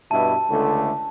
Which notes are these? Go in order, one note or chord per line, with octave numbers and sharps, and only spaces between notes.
G2 B2 E4 A5
C#2 D3 A3